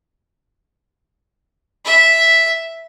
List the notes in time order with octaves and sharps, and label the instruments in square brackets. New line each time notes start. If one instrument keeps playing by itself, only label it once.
[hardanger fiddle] E5